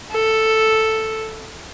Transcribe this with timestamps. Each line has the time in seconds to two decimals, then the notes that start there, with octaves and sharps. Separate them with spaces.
0.12 A4